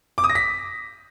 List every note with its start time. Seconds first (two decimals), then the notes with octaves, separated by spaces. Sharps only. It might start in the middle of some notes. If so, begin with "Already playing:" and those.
0.18 D6
0.24 D#6
0.30 A#6
0.35 B6